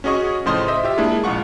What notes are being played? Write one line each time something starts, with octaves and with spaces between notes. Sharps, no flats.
C#4 F#4 G#4 D#5 C#6
A2 C#3 F3 C5 D#5 C6
C5 D#5 E5
F4 G4 E5
G#3 A#3 D4 E4 G#4
A#1 G#3 F4 F#5 C#6